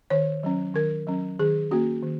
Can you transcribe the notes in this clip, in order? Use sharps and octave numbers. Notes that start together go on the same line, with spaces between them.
D#3 C#5
F#3 C#4
D#3 A#4
F#3 C#4
D#3 G#4
A#3 C#4 F#4
D#3